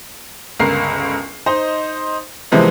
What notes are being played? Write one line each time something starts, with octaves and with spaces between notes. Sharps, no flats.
G1 C#2 A#4 C7
D#4 C5 D#5
C3 E3 F3 G#3 A#3 B3